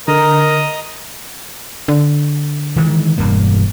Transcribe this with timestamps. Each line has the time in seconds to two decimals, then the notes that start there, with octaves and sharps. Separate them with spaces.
0.08 D3 A#4 D#5 A#5 D#6
1.88 D3
2.76 D#3 E3 G#3
3.18 E1 G2 A#3